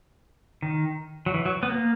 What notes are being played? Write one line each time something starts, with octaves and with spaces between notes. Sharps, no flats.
D#3
F#3
E3
F#3
B3
A#3